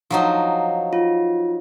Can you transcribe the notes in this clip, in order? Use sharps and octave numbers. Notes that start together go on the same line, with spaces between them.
F3 F#3 D#4
F4